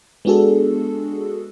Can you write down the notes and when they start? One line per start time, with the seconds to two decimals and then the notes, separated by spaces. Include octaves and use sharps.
0.25 G#3 B3 D4 F#4 G#4 A4